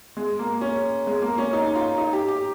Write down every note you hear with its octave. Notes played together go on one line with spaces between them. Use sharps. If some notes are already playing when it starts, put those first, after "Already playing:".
G#3
A#3
C#4
G#3
A#3
C#4
D#4
F4
D#4
G4
G4